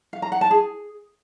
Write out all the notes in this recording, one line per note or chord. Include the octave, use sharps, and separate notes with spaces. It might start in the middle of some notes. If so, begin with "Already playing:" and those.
F5
A#5
F#5
A5
G#4